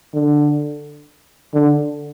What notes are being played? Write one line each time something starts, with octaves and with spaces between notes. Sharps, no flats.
D3
D3